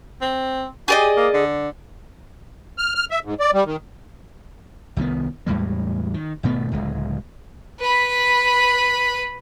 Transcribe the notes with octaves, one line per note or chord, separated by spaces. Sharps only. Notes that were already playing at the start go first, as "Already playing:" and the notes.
C4
G4 G#4 D5 D#5
A#3
D3
F6
F6
E5
G#2
D5
G3
D#3
C2 D#3 A#3 B3
E2 A2 G3 G#3
D#3
G#1 B2 A3 B3
D1 C#2 G#3
B4 B5